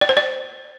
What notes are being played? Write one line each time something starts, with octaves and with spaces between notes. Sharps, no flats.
D5
C5
D5